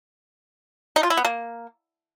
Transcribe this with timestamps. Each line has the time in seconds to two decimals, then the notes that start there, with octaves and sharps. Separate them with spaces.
0.96 D#4
1.03 F4
1.10 E4
1.17 B3
1.25 A#3